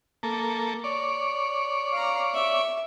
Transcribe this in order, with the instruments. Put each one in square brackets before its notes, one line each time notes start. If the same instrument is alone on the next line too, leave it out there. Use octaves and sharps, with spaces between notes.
[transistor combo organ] A#3 A4
C#5 D5
[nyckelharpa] F5 A#5
E5